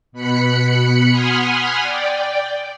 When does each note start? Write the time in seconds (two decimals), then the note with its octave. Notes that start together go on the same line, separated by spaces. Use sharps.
0.12 B2 B5 F#6 C#7
1.10 F#5 G#5 B5 C6 D#6 F6
1.82 D5 G5